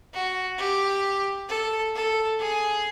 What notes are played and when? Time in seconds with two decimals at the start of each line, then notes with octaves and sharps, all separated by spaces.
0.13 F#4
0.58 G4
1.49 A4
1.95 A4
2.40 G#4